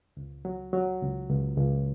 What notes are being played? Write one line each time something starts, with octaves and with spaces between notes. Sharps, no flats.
C#2
F#3
F#3
C#2
C#2
C#2